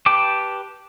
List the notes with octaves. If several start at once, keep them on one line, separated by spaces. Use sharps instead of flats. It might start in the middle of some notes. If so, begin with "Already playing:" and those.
G4 B4 G5 A5 D6